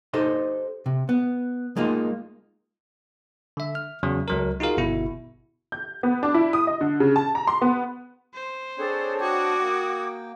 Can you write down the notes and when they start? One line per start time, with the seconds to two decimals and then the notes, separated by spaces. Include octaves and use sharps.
0.14 D#4 G4 A4 C5 D#5 C6
0.86 C3
1.09 B3
1.76 G#3 A#3 D#4 F4
3.57 D3 E5
3.75 F6
4.03 E2 C#3 F#3
4.28 C#2 F#3 A#4
4.60 D#4 F4 F#4 G#4 A#4 F5
4.77 G1 B2 E4
5.72 G6
6.03 B3
6.23 D4
6.34 E4
6.53 D#6
6.67 D#5
6.81 D3
7.00 C#3
7.16 A5
7.35 A#5
7.47 C6
7.62 B3
8.34 C5
8.78 C4 D4 G#4 A4 C#5
9.20 F#4 G5 D6 D#6 G#6
9.61 A#3